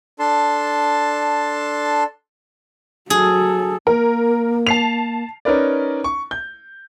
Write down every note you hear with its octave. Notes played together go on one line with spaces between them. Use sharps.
D4 A4 A5 C6
F#3 G#4 A4
A#3 A#4
A5 C7 F7
C#4 D#4 A#4 B4 D5
C#6
G6